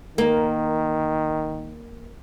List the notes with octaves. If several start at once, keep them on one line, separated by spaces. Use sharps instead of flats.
D#3 A#3